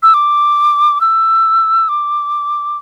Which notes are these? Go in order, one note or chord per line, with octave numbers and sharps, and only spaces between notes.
E6
D6
E6
D6